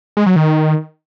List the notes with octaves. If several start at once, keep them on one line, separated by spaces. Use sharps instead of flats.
G#3
F#3
D#3